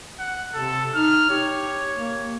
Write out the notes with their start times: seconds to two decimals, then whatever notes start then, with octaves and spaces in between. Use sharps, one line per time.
0.19 F#5
0.54 C3 A4
0.95 D#4 F6
1.30 G4 C#5
1.94 A#3